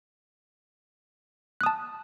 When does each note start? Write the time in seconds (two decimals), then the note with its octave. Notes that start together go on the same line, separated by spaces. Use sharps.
1.61 F#6
1.63 D#6
1.66 A5